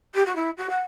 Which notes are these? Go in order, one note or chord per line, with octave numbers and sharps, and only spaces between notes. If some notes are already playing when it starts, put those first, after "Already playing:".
G4
F#4
E4
F#4
F#5